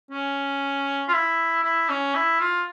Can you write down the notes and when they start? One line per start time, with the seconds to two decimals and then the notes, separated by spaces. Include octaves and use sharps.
0.11 C#4
1.08 F4
1.13 E4
1.64 E4
1.89 C#4
2.15 E4
2.40 F4